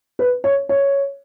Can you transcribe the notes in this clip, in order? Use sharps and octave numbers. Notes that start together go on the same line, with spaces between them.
B4
C#5
C#5